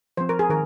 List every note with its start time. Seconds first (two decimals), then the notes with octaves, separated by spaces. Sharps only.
0.17 F3 C4 C5
0.29 A#4
0.39 G#4
0.49 D#3 A#4